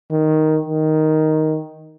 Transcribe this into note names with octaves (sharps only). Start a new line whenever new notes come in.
D#3
D#3